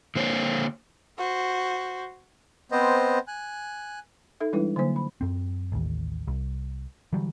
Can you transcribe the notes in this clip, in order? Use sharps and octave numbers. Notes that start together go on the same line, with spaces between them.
D3 A#3 C5 C#5
F#4 C5
B3 C4 C5 D#5
G#5 F#6
D#4 A4 E5
E3 G3 G#3 D4 E4 B4
D3 F#3 A#3 C5
B5
F#2 C4
A1 D#2
C2
D3 E3 F#3 G3